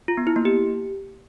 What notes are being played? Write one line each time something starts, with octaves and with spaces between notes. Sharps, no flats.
F4
B3
E4
A#3
G4